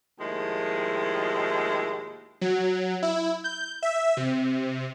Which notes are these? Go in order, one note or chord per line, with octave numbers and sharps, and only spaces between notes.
D#2 A2 F3 G#3 E4
F#3
E4
G6
E5
C3